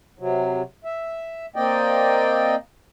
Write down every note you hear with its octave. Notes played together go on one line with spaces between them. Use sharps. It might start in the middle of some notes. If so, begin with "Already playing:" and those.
C3 F#3
E5
A#3 C4 D5 D#5 G5